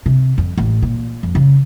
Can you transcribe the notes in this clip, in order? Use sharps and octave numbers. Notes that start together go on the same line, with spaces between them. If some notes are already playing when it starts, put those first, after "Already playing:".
C3
F2
A1
A#2
F2
C#3